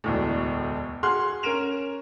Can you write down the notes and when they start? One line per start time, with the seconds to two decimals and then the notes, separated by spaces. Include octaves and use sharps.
0.04 E1 D2 A2
1.03 F#4 G#4 F#5 C6 F6 F#6
1.43 C#4 A#4 D7 E7 F7